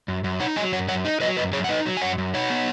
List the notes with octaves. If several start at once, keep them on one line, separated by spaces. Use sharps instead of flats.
F#2
F#2
D#4 C#5 F#5
F#3 D#5 G#5
F#2 C#5 F#5
F#2 C#5 F#5
D#4
F#3 B4 D#5
F#2 B4 D#5
F#2 G#4 C#5
F#5
D#4 B4 D#5
F#3
G#5
F#2 C#5 F#5
F#2
D#4 C#5 F#5
B3